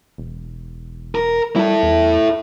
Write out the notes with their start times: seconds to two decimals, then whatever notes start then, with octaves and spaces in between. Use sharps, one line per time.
0.18 E1
1.15 A#4
1.56 G3 E4 A4
1.83 E2